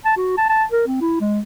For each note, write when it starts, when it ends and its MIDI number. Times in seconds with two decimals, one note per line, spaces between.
0.05 0.12 81
0.17 0.33 66
0.37 0.45 81
0.49 0.64 81
0.71 0.83 70
0.87 0.98 60
1.01 1.18 64
1.20 1.40 56